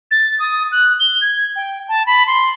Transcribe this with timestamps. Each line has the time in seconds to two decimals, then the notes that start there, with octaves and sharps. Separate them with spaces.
0.11 A6
0.39 D#6
0.72 F#6
1.00 G7
1.21 G#6
1.56 G5
1.88 A5
2.06 B5
2.27 C6